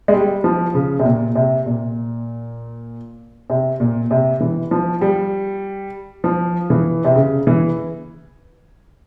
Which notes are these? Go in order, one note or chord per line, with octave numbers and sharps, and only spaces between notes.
G#3
G3
F3
C#3
C3
A#2
C3
A#2
C3
A#2
C3
E3
F3
G3
F3
E3
C3
C#3
E3